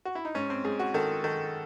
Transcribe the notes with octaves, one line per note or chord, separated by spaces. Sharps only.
F#4
E4
D#4
G#2 C#4
C4
G#2 G#4
F#4
D#3 A4
D#3 A4